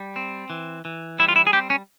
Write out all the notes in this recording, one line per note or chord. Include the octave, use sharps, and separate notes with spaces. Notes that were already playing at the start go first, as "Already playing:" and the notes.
Already playing: G3
C4
E3
E3
G3 E4
F4
E4
G#4
C4 G4
C#4